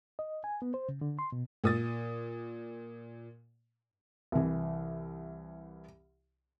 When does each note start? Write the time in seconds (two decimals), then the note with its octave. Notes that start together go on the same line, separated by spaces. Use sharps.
0.19 D#5
0.44 G#5
0.62 B3
0.74 C5
0.89 C#3
1.01 D3
1.19 C6
1.32 B2
1.64 A#2 D#6 A6
4.32 C2 E3